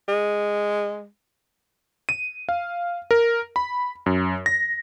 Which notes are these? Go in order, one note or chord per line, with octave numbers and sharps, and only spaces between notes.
G#3
D#7
F5
A#4
B5
F#2
A#6